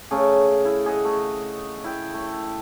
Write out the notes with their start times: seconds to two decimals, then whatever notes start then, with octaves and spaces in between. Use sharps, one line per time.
0.11 C#3 A3 G#4 A#4
0.65 E4
0.86 G#4 D#5 F#5
1.05 A3
1.84 E4 G5
2.14 A3